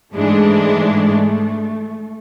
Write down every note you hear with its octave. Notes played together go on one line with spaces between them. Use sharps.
G#2 E3 G#3 A3 D4